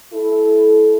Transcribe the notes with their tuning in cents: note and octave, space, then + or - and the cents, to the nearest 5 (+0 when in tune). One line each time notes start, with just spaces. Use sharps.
E4 +0 A4 -25